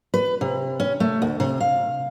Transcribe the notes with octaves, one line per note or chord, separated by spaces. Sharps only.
B4
C3
C#4
A3
D2
C3
F5